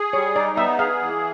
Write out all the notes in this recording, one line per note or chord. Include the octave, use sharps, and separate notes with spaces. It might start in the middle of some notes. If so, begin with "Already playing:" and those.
Already playing: G#4
G3 C#5
D#4 D5
B3 E5
G#4 F5
E3